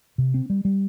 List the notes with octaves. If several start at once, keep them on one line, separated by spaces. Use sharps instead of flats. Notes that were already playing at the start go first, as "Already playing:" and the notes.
C3
C4
G3
G3